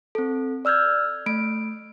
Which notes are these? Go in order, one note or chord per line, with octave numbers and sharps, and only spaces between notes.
C4 A4
D5 E6 F6 G6 G#6
A3 D7